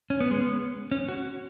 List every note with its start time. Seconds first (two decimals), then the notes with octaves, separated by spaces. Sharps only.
0.10 C#4
0.21 B3
0.31 G#3
0.41 B3
0.92 C#4
1.08 F#4